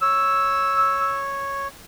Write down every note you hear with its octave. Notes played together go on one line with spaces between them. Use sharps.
C#5 E6